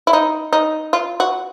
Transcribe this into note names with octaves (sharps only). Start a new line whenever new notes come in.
E4
D#4
D#4
F4
F#4